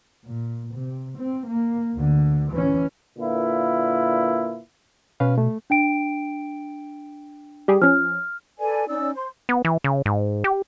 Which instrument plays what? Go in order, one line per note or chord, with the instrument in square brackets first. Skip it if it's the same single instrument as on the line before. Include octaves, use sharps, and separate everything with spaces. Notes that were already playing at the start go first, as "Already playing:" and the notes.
[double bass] A#2
C3
C4
A#3
D2 D3
E3 C#4
[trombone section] A#2 D3 A#3 E4 F4 B4
[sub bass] B2 [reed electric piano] C#4 B4 F5
[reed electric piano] A3
[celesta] D4 G5 D7
[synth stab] G3 G4 G#4
[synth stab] F3 C#4 [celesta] F6
[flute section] A4 B4 D5 G#5
C#4 D#4 D5 E6
C5 C6
[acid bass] B3
E3
C#3
G#2
G4